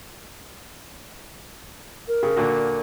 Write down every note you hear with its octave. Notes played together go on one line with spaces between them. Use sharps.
A#4
C#3
A#2 D3 F#4